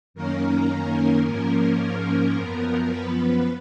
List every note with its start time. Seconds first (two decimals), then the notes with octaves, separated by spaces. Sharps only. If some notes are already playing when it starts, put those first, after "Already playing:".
0.14 F#2 D#3 A#3 C#4 A#4
1.25 G#2 F3 A#3 C#4 A#4
2.36 F#2 F3 B3
2.90 B4